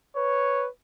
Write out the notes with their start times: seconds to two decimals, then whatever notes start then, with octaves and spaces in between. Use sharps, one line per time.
0.16 B4 C#5